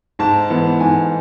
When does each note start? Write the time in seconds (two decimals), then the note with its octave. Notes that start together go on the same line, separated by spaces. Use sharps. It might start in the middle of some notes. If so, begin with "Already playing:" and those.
0.19 G#2 A5
0.50 E3 B3
0.80 G#2 G#5